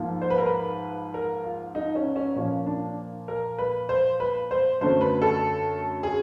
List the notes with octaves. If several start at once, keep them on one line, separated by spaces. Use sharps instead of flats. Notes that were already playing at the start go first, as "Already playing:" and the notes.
Already playing: G#2 F3 A#3
C5
B4
A#4
B4
A#4
F4
D#4
C#4
C#4
A#2 F3 A#3 C#4
D4
A#4
B4
C5
B4
C5
F#2 D3 F#3 A3 C5
B4
A4
G#4